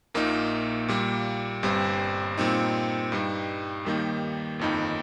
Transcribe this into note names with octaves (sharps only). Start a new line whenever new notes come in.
A#1 A#2 A#3 D#4
A#2 G3 A#3
G1 G2 G3 C4
A#2 G3 C4 D#4
G2 G3 D#4
D#2 D#3 G3 A#3 D#4
G1 F2 D#3 A#3 D#4